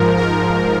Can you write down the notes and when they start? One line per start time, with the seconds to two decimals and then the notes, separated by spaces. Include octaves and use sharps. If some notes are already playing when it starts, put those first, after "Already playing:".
Already playing: G#2 F3 A#4
0.17 A#4